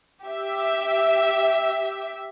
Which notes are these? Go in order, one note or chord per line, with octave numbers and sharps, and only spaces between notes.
G4 E5